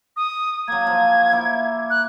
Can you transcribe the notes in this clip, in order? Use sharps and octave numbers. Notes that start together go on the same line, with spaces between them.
D#6
F#3 A#3 G#6
F3
A#3 E4
F#6